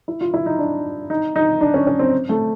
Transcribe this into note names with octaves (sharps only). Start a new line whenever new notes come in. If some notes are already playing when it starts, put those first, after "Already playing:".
E4
F4
E4
D#4
D4
D#4
D#4
D4
C#4
C#4
C4
A3